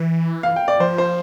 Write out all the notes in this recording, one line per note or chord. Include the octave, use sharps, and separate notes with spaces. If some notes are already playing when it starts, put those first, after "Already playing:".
Already playing: E3
F5
G5
D5
F3 C5
C5